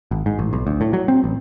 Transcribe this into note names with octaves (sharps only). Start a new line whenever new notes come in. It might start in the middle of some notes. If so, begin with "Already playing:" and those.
G#1
G#2
A1
B1
D2
A2
F#3
C4
A1